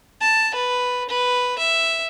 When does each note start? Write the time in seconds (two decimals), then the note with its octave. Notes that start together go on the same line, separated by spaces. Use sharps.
0.21 A5
0.55 B4
1.09 B4
1.59 E5